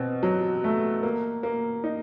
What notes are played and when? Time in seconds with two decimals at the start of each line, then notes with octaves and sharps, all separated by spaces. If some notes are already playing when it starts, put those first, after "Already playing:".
Already playing: B2 C4
0.23 F#3
0.64 A3
1.03 A#3
1.43 A#3
1.84 D#4